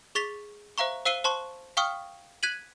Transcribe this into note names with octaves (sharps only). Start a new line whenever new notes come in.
G#4 C#6 A6 B6 F7
C5 E5 F5 A#5 C#6
C5 F5 E6 C7 D#7 G7
C5 A5 C6 C#6
F5 G5 C#6 D#6 F6
F#6 G#6 B6 D#7 F#7